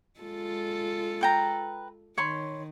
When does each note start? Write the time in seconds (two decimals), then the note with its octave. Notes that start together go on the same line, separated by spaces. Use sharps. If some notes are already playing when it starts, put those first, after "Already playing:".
0.20 G#3 F4 A4
1.21 B4 G5 A#5
2.18 D#3 C#5 B5 C6